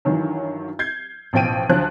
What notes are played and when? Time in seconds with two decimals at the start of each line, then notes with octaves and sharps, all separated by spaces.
0.05 G2 D#3 E3 F#3
0.79 G6 G#6 C7
1.33 A1 B2 F3 G5 D7 D#7
1.69 D2 F3 F#3 F#6